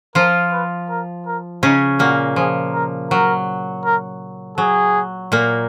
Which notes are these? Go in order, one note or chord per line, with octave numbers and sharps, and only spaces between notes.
F3 F4 A#4
B4
A#4
A#4
C#3 C#4 D#4
A#2 A#3 F#4
F3 G#4
A#4
F#3 A#4
A#4
F#3 G#4
A#2 A#3